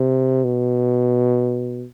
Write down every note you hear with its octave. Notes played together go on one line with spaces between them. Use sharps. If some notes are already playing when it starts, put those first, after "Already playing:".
Already playing: C3
B2